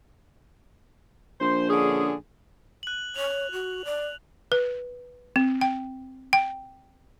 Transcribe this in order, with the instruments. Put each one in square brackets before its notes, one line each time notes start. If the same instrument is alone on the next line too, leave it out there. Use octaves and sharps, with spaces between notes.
[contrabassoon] A#1 [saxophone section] C5
[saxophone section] D3 C#4 G#4
[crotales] F#6 F#7
[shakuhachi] C#5 [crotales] F7
[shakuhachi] F#4
D5
[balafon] B4
C4
G5
G5